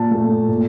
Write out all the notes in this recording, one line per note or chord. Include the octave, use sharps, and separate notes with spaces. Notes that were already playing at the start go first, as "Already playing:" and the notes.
Already playing: A#2 A5
A3
A#2